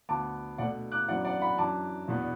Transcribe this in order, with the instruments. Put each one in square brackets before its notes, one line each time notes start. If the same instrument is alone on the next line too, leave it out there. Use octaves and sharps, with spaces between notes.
[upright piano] D2 D3 B3 A5 D6
B2 A3 D4 D5 F#5
D6 F#6
F#2 E3 B3 D4 D5 F#5
D5 F#5
F#5 B5
F#2 E3 D4 A5 D6
E2 B2 B3 D4